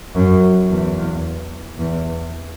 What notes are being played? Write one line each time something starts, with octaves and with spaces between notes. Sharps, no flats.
F#2
E2
E2